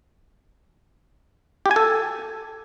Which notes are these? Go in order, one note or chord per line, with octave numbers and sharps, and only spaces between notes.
G4
G#5
A4